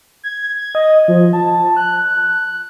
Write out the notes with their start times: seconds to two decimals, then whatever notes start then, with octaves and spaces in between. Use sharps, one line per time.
0.23 G#6
0.75 D#5
1.08 F3
1.33 A5
1.77 F#6